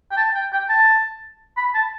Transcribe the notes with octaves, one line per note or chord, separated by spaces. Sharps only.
G5
A5
G5
G5
A5
B5
A5